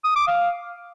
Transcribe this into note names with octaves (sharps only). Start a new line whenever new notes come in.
D#6
D6
F5